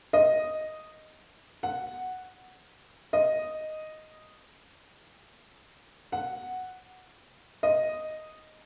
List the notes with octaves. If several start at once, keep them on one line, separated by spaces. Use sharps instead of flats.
D#5
F#5
D#5
F#5
D#5